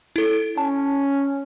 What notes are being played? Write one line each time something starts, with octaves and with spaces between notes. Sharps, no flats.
E4 A4
C#4 A5